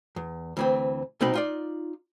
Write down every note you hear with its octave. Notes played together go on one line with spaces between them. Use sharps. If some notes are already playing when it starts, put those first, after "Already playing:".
E2
D2 E3 C4
C2 B2 C4 D#4 B5
D#4 F4 D5